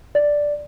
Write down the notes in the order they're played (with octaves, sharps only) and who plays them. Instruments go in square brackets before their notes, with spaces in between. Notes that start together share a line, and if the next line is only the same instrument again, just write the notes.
[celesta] D5